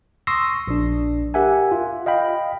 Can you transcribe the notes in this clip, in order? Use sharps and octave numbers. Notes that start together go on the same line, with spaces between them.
C6 C#6 D#6 E6 A#6 C7
A#1 D4
G4 A#4 E5 F#5 G#5
F4
D#5 F5 G5 B5